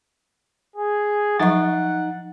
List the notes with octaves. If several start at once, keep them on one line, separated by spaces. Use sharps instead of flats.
G#4
F3 F#3 D#4 F#5 C#6 A6